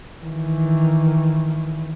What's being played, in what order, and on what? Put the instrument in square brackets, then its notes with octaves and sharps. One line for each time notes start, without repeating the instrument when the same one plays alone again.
[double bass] D#3 E3